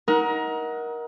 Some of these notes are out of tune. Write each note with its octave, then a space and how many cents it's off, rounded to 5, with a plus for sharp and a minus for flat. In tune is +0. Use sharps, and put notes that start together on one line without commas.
D#4 +30 A#4 +20 F#5 +0